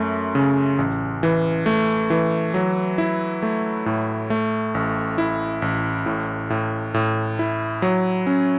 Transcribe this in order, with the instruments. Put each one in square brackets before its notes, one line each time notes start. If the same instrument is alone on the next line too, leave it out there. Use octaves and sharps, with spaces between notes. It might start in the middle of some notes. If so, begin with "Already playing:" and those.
Already playing: [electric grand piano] F#2 A3
C#3
A1
E3
A3
E3
F#3
E4
A3
A2
A3
A1
E4
A1
A2
A2
A2
E4
F#3
C#4